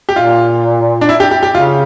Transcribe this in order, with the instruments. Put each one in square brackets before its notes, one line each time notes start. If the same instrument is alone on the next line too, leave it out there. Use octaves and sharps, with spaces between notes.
[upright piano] G4
[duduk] A#2 [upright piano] F4
[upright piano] D4
E4
G4
G4
G4
[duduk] C#3 [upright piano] F4